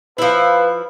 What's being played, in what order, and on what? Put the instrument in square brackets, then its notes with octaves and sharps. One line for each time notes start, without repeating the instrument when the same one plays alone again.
[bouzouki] F3 E4 [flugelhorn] B4